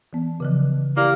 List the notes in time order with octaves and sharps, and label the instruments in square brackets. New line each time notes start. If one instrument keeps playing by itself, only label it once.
[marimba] E3 B3
C#3 E3 F3
[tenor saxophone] A#3 [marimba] E4 G4 D5